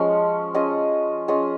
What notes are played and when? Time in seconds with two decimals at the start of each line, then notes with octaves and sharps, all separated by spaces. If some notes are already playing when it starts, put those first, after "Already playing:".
Already playing: F3 G#3 C#4
0.54 C#4 F4 G#4 D#5
1.28 C#4 F4 G#4 D#5